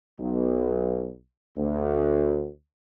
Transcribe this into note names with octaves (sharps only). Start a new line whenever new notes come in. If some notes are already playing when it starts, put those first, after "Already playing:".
B1
D2